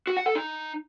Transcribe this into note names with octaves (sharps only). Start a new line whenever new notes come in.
F#4
F#5
A4
D#4